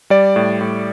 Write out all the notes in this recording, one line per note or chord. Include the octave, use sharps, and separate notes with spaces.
G3 D5
A2
A2